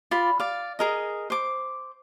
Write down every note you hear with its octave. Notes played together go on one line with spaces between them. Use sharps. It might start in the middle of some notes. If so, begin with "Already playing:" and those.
F4 D5 B5
D5 F5
G#4 A#4 D#5
C5 D6